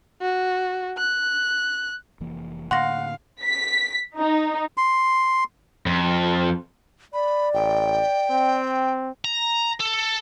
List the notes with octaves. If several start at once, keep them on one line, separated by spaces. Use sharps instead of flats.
F#4
F#6
F1 E3 A#3
A2 D3 A#3 F5 F#5 C6 C#6 A#6
B6
D#4
C6
F2
D5 B5
A1 G5
C4
A#5
A4